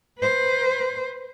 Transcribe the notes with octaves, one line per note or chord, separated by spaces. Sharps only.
B4 C5